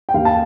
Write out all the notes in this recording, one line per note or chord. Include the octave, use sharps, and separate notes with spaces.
G5
D#2 D#3 F5
A5